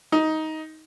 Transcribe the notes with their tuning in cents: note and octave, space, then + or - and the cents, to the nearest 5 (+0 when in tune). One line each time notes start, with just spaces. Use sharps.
D#4 +15